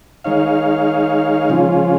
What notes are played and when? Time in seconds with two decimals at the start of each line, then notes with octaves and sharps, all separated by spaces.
0.24 D#3 G#3 D#4 C#5 F5
1.50 C#3 F3 G#3 C#4 F4